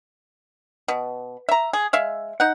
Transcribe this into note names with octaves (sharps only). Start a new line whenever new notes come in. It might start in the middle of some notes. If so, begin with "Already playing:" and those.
B2
E5 A#5
G#4
G#3 E5 F5
D#4 F#5